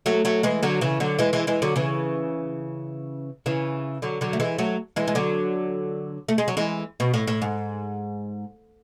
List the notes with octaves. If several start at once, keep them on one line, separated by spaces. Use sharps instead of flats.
F#3 A3
F#3 A3
E3 G#3
D3 F#3
C#3 E3
D3 F#3
E3 G#3
E3 G#3
E3 G#3
D3 F#3
C#3 E3
C#3 E3
D3 F#3
D3 F#3
A3
E3 G#3
F#3 A3
E3 G#3
G#3
D3 F#3
A3
G#3
F#3
E3 G#3
B2
A2
A2
G#2